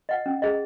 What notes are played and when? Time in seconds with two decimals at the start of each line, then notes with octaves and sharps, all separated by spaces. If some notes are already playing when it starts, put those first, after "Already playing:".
0.09 D#5 F#5
0.26 C#4
0.42 G#4 D#5